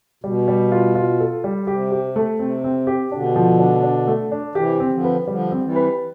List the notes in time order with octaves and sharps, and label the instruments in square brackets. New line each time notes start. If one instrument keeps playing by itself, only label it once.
[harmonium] B2 [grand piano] G3
[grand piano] G3
F4
F4
A4
G3
[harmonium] C3 [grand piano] G4
[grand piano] G4
A3
[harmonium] C3 [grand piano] C4
[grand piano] C4
G4
[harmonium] B2 D3 [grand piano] D4
[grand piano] F3
D4
D4
A3
D4
[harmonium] C3 E3 [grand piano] G4
[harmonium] E3 [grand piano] C4
[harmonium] D3 F3
[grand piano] B4
[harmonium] D3 F3 [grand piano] G3
[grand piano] C4
[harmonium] E3 G3
[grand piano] B4